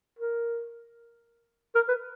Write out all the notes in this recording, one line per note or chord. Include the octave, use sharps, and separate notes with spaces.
A#4
A#4
B4